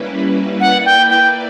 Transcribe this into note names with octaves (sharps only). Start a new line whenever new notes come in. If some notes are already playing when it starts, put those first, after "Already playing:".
Already playing: G3 A#3 C#4 E4 B4
A#3 E4 B4 D5 F#5
G5
G5